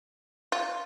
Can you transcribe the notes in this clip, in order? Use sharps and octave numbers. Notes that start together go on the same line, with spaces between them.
F4